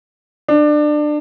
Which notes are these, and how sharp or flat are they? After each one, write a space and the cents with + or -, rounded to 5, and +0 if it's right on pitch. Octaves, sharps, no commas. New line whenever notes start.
D4 +25